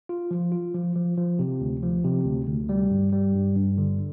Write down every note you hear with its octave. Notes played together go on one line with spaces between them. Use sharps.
F4
F3
F4
F3
F3
F3
C3
D2
F3
C3
D2
D2
G3
G2
G3
G2
G2
D3